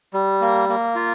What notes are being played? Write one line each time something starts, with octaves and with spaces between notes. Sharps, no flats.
G3
A#3
A#3
F4